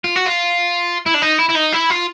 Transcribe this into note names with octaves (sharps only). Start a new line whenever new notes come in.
F4
F#4
F4
E4
D4
D#4
E4
E4
D#4
E4
F4